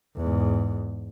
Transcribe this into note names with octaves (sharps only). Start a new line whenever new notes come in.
E2 G#2